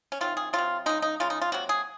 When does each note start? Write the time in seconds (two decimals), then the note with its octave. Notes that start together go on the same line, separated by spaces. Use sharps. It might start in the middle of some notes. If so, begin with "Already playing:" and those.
0.12 C#4
0.21 C3 D#3 F#3 F4
0.37 G#4
0.53 D#3 F#3 F4
0.58 C3
0.86 C#3 G#3 D#4
1.02 D#4
1.20 C#3 G#3 F4
1.30 D#4
1.42 F4
1.52 C3 F#3 A#3 F#4
1.69 G#4